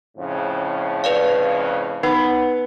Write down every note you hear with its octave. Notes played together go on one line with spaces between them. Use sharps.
F2 A2 C#3
B4 D5 F5
B3 D#4